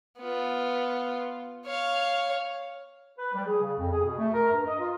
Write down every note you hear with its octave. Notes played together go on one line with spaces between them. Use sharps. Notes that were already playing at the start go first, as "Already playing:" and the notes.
B3 F4
C#5 F5
B4
G3
G#4
C#3
F2
G#4
B2
A3
A#4
G2
D#5
F4